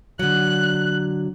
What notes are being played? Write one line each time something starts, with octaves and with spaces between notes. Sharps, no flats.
D3 F#3 F#6